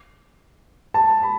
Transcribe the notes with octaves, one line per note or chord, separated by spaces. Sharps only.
A5
B5